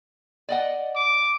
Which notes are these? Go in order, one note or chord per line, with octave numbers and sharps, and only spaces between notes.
D5 D#5 F#5
D6